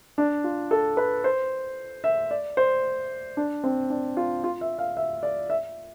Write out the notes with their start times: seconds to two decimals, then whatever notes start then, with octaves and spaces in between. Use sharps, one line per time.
0.18 D4
0.44 F4
0.71 A4
0.97 B4
1.24 C5
2.04 E5
2.31 D5
2.57 C5
3.37 D4
3.64 C4
3.90 D4
4.17 F4
4.44 F4
4.61 E5
4.78 F5
4.97 E5
5.23 D5
5.50 E5